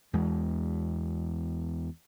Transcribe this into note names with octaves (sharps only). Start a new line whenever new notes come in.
E2 G#3